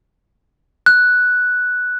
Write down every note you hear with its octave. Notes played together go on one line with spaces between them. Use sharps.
F#6